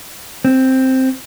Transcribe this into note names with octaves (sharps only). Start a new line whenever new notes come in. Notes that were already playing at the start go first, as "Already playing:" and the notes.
C4